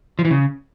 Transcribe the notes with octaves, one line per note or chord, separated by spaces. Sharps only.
F3
E3
C#3